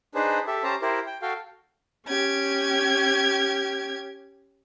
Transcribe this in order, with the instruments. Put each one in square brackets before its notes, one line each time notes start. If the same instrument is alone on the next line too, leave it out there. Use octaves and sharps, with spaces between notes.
[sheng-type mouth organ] D4 D#4 G#4 B4 C5
G4 A4 E5
C#4 G4 C5 A5 A#5
E4 G4 A#4 C5
G5
F#4 A4 F5 G5
[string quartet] C#4 G4 G#6